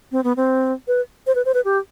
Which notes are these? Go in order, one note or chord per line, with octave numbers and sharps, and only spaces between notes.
C4
B3
C4
B4
C5
B4
C5
B4
G4